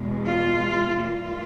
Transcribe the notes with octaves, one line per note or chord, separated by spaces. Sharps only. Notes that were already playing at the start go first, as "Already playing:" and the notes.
Already playing: E2 B2 G#3
F4
G#2 E3 G3 A#3 F4